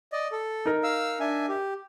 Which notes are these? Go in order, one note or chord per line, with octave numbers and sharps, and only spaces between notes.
D5 D#5
A4
D#4 A#4
F5 E6
D4 E5 G#5
G4